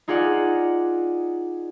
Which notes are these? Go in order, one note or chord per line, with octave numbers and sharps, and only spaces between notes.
D#4 F4 G#4 D5 F#5